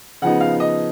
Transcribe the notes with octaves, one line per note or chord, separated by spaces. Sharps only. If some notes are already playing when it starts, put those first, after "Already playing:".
C#3 F3 B3 D#4 F#5
F5
D#5